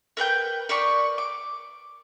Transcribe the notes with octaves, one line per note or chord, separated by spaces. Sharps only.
A#4 B4 G5 G6
A#4 B4 D5 C#6
D6